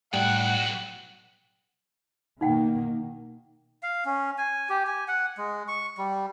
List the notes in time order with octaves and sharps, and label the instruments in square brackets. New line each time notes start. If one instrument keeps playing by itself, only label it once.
[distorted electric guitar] B1 F#4 [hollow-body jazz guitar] A2 G3 [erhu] F#5 [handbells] G5
[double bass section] B2 D#3 A#3 [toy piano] D#4 F#5 G5
[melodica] F5
C#4
G#5
G4
G#5
F#5
G#3
C#6
G3